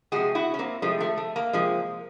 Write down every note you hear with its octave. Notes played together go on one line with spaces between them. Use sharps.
C3 F3 G#3 F#4 G#4
E4 F#4
C#4
A#3 C4
C3 F3 G#3 A3
A3
A3
A#3
C3 F3 G#3